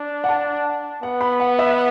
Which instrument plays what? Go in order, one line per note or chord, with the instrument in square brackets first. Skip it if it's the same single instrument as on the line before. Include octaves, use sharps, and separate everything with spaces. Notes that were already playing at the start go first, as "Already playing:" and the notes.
Already playing: [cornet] D4
[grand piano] F#5
A5
[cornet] B3 [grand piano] F#5
[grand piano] B5
F#5
E5